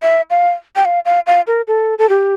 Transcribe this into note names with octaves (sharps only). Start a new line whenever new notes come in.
E5
F5
G5
F5
F5
F5
A#4
A4
A4
G4